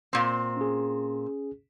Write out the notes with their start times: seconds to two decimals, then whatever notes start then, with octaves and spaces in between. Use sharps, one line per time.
0.13 A#2 C4
0.57 C#4 G#4